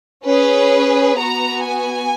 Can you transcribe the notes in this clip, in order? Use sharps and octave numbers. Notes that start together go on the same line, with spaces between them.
C#4 G#4 B4
B3 F#4 A#5
G#5